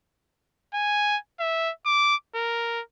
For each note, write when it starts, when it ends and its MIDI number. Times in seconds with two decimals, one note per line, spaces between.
0.74 1.17 80
1.40 1.71 76
1.86 2.15 86
2.35 2.81 70